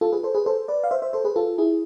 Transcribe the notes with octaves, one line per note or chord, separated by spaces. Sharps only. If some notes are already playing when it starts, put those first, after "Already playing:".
F4 A4
G#4 B4
A4 C5
G#4 B4
A4 C5
B4 D5
F5
C5 E5
C5 E5
A4 C5
G#4 B4
F4 A4
E4 G#4